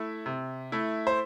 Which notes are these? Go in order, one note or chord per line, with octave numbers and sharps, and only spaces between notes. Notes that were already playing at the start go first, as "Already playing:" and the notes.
Already playing: A3 E4
C3
A3 E4
C5